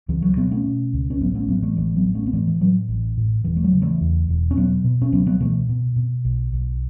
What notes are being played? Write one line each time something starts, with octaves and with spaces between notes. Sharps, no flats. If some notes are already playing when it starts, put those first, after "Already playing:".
C#2 E3
F#3
B2 F#3 B3
A3 C#4
B2
C#2
C#4
A1 F#3 B3
A3 C#4
A2 F#3 B3
E3 A3
A1 E3 A3
F#3 B3
A2
A3 C#4
B3
A2 E3 A3
E3
A2 F#3
A1
A2
E1 E3
A3
F#3
C#3
E3 A3
E2
E1
C#4
B2 F#3 B3
B2
C#4
C#2 F#3 B3
F#3 B3
B2 E3 A3
B2
B2
B1
B1